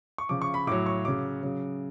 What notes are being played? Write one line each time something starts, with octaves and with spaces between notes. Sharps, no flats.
C#6
C#3 F3 D6
C#6
B5
A2 F#3 D6
C#6
C#3 F#3 D6
C#3 F#3